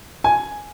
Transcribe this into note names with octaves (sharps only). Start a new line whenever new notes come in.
G#5